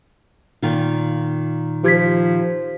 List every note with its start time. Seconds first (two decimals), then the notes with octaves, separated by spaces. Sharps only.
0.62 A#2 D#3 F4
1.84 F3 G4 G#6 B6